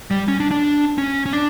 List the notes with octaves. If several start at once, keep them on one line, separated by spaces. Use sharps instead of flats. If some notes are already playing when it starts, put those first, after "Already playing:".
G3
C#4
D4
D4
C#4
C#4
D4